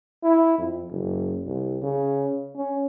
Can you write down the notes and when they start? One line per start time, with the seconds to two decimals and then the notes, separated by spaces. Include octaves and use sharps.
0.23 E4
0.58 F2
0.90 F#1
1.46 C2
1.83 C#3
2.56 C#4